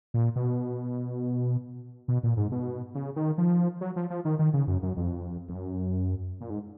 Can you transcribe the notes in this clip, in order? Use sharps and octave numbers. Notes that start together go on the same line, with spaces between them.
A#2
B2
B2
A#2
G#2
B2
C#3
D#3
F3
F#3
F3
F3
D#3
D#3
C#3
F#2
F#2
F2
F2
F#2
A#2
G#2